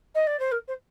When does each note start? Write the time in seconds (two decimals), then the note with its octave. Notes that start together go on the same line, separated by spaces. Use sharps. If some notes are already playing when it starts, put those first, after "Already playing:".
0.15 D#5
0.27 D5
0.40 C5
0.52 A#4
0.68 C5